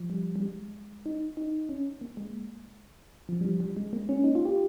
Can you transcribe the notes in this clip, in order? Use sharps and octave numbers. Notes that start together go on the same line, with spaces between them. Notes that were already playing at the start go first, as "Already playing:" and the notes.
Already playing: F3
G3
G3
G#3
D#4
D#4
C#4
A#3
G#3
F3
G3
F3
G3
G#3
A#3
C#4
D#4
F4
G4